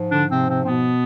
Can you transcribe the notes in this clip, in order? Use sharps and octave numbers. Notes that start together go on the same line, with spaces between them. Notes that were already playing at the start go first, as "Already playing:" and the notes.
Already playing: G#2 F3
D3 D4
C3 C4
C3 C4
C4
B2 B3